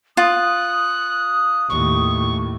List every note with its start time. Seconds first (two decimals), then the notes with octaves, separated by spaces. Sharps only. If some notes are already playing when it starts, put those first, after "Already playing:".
0.17 F4 D#6 F#6
1.70 D#2 A2 C#6